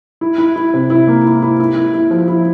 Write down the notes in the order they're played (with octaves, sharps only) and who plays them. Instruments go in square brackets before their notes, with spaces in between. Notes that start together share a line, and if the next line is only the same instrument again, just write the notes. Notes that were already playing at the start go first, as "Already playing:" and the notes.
[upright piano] E4
E4
E4
C3
E4
A#3
E4
E4
E4
E4
E4
F3
E4